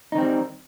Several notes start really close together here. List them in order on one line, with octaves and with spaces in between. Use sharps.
D#4 D#3 C4 G3